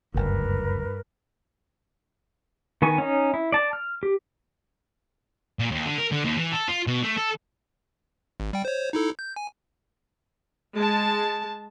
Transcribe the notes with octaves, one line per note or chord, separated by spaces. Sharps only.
F#1 D2 G2 A#4 B4
D#3 B3 G#5 C#6
C#4 D#4
E4
D5 A5
F6
G4
A#2
D#2
D3
A#4
D3
D#2
E3
A4
F4
B2
A3
A4
G#1
G3 G5
C5 C#5
D#4 E4 A4
G6
G#5
G#3 A5